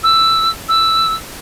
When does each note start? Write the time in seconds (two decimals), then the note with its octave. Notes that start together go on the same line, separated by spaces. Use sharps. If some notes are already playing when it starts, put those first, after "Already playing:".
0.03 E6
0.68 E6